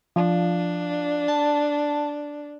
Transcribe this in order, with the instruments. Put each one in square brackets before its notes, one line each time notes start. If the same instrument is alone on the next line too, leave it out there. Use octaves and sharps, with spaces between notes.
[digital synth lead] F3 [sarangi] D4
[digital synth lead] A5